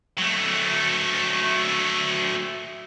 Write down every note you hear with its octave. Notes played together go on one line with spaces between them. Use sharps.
F#3 A3